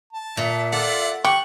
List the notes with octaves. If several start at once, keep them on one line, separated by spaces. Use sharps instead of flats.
A5
A#2 E5
F4 A4 D5 F#5
G4 F#5 C#6